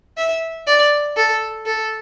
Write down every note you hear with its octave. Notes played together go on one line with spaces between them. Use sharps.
E5
D5
A4
A4